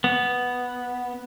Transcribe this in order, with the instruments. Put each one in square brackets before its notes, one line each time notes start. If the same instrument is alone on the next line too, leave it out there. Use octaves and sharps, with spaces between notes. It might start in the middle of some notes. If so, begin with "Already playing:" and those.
[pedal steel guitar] B3